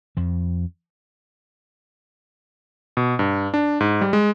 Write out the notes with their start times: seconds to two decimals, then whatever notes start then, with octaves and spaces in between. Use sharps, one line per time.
0.17 F2 F3
2.97 B2
3.19 G2
3.54 D4
3.81 G#2
4.01 G3
4.13 G#3